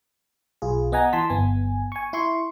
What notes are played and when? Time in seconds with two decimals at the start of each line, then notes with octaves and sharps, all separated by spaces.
0.62 B1 F4 G#4
0.92 B3 D#5 F#5 G#5 A#5
1.13 E3 A5 C6 B6
1.30 G1 B3 G#5
1.92 G#5 C#6
2.13 E4 C6 C#6